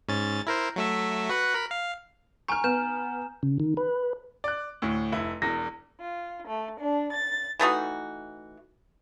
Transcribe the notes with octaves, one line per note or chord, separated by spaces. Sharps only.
G#2 C#4 A6
E4 A#4 C5
F#3 A3 E5
F#4 B4 F#5
A#4 B5
F5
G#5 A#5 C#6 F6
B3 G6 E7
C#3
D#3
B4
D5 F#6
D2 A2
F1 E4
E1 E2 A#6
F4
A3
D4
A6
E3 A3 D#4 F#4